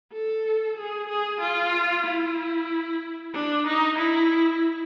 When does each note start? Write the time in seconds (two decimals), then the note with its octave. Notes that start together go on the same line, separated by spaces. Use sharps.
0.13 A4
0.77 G#4
1.09 G#4
1.41 F4
2.06 E4
3.34 D4
3.67 D#4
3.98 E4